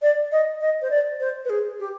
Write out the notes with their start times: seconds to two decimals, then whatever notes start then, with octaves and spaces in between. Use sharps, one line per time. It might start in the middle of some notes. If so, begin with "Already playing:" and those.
0.02 D5
0.32 D#5
0.61 D#5
0.82 C5
0.91 D5
1.20 C5
1.45 B4
1.50 G#4
1.80 G4